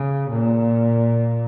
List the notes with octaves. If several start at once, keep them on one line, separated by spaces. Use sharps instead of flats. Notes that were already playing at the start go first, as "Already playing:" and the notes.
Already playing: C#3
A#2